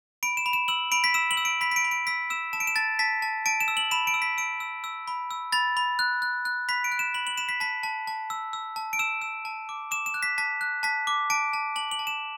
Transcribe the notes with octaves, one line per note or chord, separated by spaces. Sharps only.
B5 D7
E7
B5
E7
E6 F#7
B5 D7
B6
E6 E7
F#7
E6
D7
B5 B6
B6
D7
B5
D7
E6 B6
E6 E7
A5 E7
D7
E7
A5 A6
A5 B6
A5
A5 D7
E7
E6
F#7
B5 E7
D7
E6
B6
E6 D7
E6
E6
B5
E6
B5 A6
B5
F#6
F#6
F#6
B5 B6
D7
F#6
E7
B5 F#7
F#7
B5 E7
B6
A5 B6
A5
A5
E6
E6
A5
D7
E6 E7
E6
A5
D6
D6 E7
E7
F#6
B6
A5 B6
F#6
A5 B6
D6
A5 D7
A5
A5 F#7
F#7
A5
E7